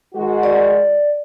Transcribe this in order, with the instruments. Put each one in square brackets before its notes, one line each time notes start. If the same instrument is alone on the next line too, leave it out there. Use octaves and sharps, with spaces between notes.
[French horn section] D#3 G#3 F#4
[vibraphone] D5